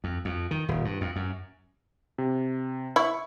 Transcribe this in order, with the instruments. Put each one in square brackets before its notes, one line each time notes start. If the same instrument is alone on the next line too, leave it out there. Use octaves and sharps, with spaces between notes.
[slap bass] F2
F2
D#3
D#1
G2
F2
F#2
[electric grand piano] C3
[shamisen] E4 [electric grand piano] C#6